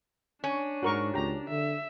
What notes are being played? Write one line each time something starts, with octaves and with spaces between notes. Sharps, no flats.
C#4 D4
G#2 F#4 A#4 C#6
C#2 G4 A#5
D3 E5